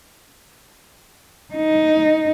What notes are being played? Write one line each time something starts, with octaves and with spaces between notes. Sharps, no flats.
D#4